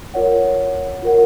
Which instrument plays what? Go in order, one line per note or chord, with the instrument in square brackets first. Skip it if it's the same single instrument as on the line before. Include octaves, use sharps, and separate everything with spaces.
[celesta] F4 A#4 C#5 F#5
F4 A#4 C#5 F#5